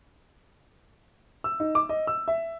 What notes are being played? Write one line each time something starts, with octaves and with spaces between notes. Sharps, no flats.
E6
D#4
D6
D#5
E6
E5